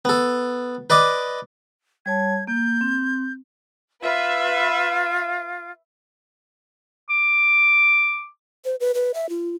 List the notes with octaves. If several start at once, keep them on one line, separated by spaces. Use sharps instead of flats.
B3 A4
B4 D5 D#5 D6
G3 C#5 A5 G#6
A#3 G6
C4
F4 B4 E5 F5
D6
C5
B4
B4
E5
F4